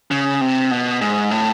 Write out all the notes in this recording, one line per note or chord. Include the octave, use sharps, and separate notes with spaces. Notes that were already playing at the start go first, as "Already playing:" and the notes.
C#3
C3
B2
G#2
A2